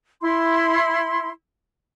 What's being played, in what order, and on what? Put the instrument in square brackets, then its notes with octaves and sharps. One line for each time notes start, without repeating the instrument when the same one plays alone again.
[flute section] E4 C6